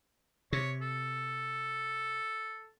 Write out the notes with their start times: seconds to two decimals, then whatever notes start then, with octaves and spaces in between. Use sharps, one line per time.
0.53 C3 C#5
0.82 A4